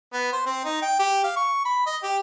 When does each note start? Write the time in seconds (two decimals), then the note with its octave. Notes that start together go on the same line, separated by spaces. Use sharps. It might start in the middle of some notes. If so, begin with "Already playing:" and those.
0.13 B3
0.33 C5
0.46 C4
0.65 D#4
0.82 G5
0.99 G4
1.24 F5
1.36 C#6
1.65 B5
1.86 D#5
2.03 G4